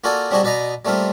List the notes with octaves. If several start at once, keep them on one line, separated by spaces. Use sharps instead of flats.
A#3 F4 F#4 A4 D5 G#5
G3 C4 D4 F#4 G#4 D#5
B2 B4 D5 D#5 A#5
G3 A3 A#3 C4 F4